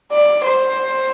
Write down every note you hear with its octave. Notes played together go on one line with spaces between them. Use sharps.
D5
C5